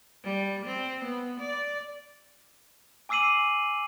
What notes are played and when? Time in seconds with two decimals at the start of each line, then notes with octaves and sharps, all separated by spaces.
0.23 G3
0.65 C4
1.04 B3
1.39 D5
3.09 G#5 D6 E6 C7 D#7 F#7